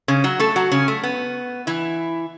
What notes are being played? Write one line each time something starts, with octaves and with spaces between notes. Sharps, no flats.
C#3 C#4
F#3 F#4
A3 A4
F#3 F#4
C#3 C#4
A3
B3
E3 E4